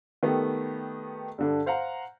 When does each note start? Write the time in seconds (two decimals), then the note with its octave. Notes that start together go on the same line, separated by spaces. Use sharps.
0.23 D#3 A3 B3 G4
1.38 G2 D3 D4
1.66 C5 F5 F#5 A#5